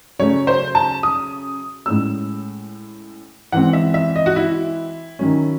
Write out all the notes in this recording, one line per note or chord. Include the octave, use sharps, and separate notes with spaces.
C#3 F#3 A3 C#4 C#5
C5
A5
D#6
A2 G#3 C#4 E6
E3 G#3 C4 F#5
E5
E5
D#5
F#4
E4
D#3 F#3 C#4